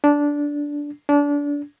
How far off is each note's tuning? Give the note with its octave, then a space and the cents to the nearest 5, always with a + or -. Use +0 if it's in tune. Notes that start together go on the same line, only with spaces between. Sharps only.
D4 -10
D4 -25